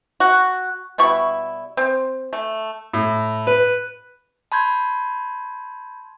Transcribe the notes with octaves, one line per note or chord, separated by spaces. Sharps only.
F#4
B2 G3 E4 C#6
C4
A3
A2
B4
A5 B5 C6 G6 G#6